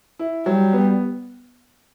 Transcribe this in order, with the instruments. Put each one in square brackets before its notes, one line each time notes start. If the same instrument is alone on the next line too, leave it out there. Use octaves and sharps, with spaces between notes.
[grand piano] E4
[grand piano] F#3 [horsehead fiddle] G3
[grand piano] B3